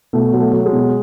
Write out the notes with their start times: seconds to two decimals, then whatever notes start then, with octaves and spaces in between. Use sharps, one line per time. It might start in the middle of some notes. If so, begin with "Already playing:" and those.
0.13 B2 A3
0.33 F#3
0.40 A3
0.52 F#3
0.66 G#3
0.73 B2